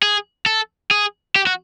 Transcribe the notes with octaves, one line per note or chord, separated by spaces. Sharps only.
G#4
A4
G#4
G4
F#4